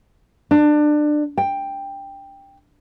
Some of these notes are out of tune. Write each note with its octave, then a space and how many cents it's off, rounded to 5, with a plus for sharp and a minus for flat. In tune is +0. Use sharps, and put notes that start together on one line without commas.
D4 +25
G5 +10